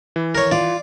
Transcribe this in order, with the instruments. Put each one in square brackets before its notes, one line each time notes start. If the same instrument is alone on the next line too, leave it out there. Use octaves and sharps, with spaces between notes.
[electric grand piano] E3
[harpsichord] A#4 C#5
[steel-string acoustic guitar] F4 [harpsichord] D5